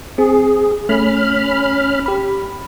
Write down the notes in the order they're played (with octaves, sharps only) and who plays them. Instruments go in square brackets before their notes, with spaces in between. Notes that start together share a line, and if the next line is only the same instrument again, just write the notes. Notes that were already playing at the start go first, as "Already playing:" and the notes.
[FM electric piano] C4 [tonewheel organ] G#4
[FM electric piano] A3 [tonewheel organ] C#4 B5 F6
[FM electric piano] G4 B5